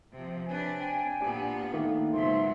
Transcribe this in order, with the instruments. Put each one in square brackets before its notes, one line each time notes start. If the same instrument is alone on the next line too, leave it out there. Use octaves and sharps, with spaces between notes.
[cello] C3 F3
[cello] C3 D4 [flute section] B4 C#5 G#5
[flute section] G5 G#5
[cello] A#2 B3 [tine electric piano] D4 G4
[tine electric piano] D#3 A3 A#3 [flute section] D4
[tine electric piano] C#2 G#2 [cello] B2 F#3 [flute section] E5 C6